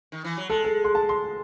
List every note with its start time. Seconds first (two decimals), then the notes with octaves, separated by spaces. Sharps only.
0.12 D#3
0.24 E3
0.37 F#3
0.49 G#3 A4
0.65 A4
0.84 C6
0.95 A5
1.09 C6